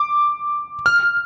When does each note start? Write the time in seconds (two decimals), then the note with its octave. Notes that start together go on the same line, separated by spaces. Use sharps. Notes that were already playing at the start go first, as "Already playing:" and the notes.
Already playing: D6
0.86 F6